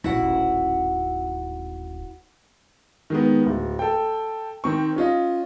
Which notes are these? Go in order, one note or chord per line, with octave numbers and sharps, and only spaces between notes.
D#1 A1 E4 F#4 F#5
D#3 G#3 B3
D1
A4 G5
D#3 C4 C#6
C#4 F4 D#5